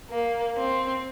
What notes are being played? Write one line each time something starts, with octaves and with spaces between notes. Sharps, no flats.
A#3
C4